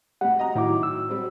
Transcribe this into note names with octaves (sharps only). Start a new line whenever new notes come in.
A2 G3 F#5
D#5 A#5
A2 D#3 F#3 E4 D6
E6
F#3 G3 C4